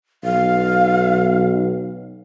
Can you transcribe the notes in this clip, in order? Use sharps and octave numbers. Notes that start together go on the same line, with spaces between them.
B1 F5